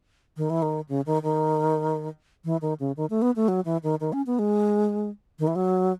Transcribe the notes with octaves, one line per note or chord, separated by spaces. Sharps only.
D#3
E3
D#3
C#3
D#3
D#3
E3
D#3
C#3
D#3
A3
B3
A3
F#3
E3
D#3
D#3
C#4
B3
G#3
D#3
E3
F#3